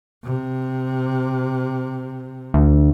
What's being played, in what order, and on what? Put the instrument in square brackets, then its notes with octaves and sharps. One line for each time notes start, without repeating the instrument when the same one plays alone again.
[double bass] C3
[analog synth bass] D2